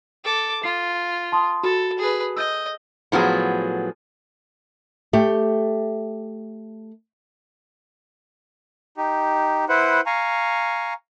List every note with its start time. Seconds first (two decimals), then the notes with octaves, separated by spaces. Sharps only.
0.24 A4 D6
0.63 F4 C7
1.32 A5 C6 D#6
1.63 F#4 A4 B5
1.99 G#4 B4
2.36 D#5 E6 G6
3.12 A2 F3 F#3 B3 G#4
5.13 A3 G4
8.97 D#4 G4
9.69 E4 B4 C5 F#5
10.06 F5 G#5 A#5 C#6